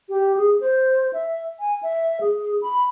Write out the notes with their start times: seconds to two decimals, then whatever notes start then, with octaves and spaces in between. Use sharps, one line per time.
0.09 G4
0.37 G#4
0.60 C5
1.13 E5
1.60 G#5
1.83 E5
2.21 G#4
2.62 B5